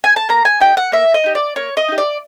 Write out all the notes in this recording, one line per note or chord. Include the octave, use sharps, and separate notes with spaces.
G#5
A5
A#3 A#5
G#5
D#4 G4 G5
F#5
A#3 E5
D#5
D#4 G4
D5
A#3 C#5
D#5
D#4 G4
D5